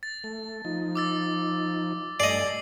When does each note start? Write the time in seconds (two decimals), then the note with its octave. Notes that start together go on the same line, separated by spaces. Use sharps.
0.03 A6
0.24 A3
0.65 F3 D#4
0.95 D6 E6 A6
2.20 G2 A3 D5 D#5 G#5 C7 F#7